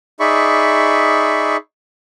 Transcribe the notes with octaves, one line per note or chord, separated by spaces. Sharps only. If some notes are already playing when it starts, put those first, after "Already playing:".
D#4 G#4 D5 E5 B5 C#6